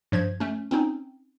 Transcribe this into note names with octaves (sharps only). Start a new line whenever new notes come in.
G2 F3 G#6
A3 C#4
C4 C#4 D#4